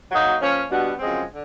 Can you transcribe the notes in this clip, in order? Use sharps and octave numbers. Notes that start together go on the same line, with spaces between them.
F#3 A#3 D#4 F#4
F3 A#3 C#4
B2 G3 B3 D4 F#4
F#2 C#3 F3 G#3 C4
D3